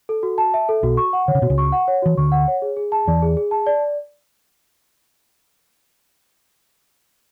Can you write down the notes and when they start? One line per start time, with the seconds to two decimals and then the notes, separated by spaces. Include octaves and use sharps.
0.09 A4
0.23 F#4
0.38 A5
0.54 E5
0.69 A4
0.83 B1 B2 F#4
0.97 C#6
1.13 F#5
1.28 D3 C#5
1.35 C#3
1.42 B2 F#4
1.50 C#2 C#3
1.58 C#6
1.72 F#5
1.88 C#5
2.02 E3 F#4
2.17 D2 D3 C#6
2.32 F#5
2.48 C#5
2.62 G#4
2.76 G#4
2.92 A5
3.07 E2 E3 D5
3.22 G#4
3.37 G#4
3.51 A5
3.66 D5